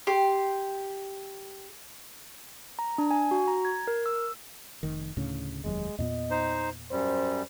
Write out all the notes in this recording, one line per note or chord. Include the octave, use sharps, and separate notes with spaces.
G4 C6
A#5
D4
G#5
F#4
A#5
G#6
A#4
E6
F1 D#3
D2 A2 C#3
F1 D#2 F#3 G#3
E2 A#2 B3 D#5
D#4 C5
F#2 G3 C5